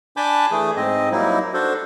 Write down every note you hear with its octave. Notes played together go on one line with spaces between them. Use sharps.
D4 G#5 A5 B5 D6 G6
E3 A3 G#4
G#2 C4 D#5
F#3 G3 A#3 D#4 E4
D4 F#4 A4 C5